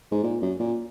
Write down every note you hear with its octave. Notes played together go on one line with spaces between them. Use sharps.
G#2
A#2
F#2
A#2